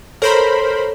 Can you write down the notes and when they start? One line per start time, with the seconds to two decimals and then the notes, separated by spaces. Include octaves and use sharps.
0.22 A4 A#4 C5 C#5 B5